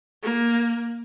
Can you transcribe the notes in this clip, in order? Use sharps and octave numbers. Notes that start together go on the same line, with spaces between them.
A#3